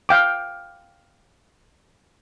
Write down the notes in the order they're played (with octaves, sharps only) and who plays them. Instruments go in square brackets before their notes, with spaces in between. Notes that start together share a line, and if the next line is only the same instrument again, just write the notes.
[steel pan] F5 G5 D6